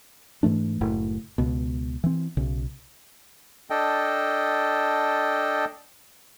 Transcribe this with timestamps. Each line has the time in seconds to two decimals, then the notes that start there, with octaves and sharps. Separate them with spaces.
0.43 G#2 E3 A3 D4
0.81 F#1 A2
1.38 C#2 B2
2.04 E3 C4
2.37 B1 C#3
3.70 D4 A4 D#5 G5